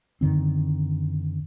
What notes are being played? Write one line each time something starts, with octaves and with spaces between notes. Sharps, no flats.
F#2 D3 D#3 C4